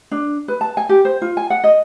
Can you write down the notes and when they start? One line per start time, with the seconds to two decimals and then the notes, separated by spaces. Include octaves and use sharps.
0.11 D4
0.48 B4
0.61 A5
0.77 G#5
0.89 G4
1.05 C5
1.22 F4
1.37 G#5
1.50 F#5
1.64 D#5